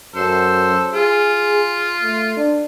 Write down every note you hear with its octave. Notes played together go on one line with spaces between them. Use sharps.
F#2 A4 C5
F4 G#4
A3
D4